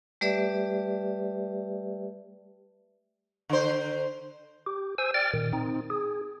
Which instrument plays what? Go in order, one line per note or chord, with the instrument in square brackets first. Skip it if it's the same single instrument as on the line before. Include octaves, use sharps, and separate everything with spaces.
[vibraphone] G3 A3 G4 B4 D5 E5
[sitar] D3 C5
[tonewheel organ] G4
C5 G#5 E6
D5 G5 F6 A6
A#2 D#3
C4 D#4
G#4